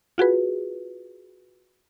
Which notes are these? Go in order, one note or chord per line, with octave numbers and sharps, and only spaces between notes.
F4 F#4 G#4 B4